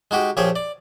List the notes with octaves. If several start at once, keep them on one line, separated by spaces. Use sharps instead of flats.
G#3 D#4 F#4 G4
A#1 F3 G4 G#4 C#5
D5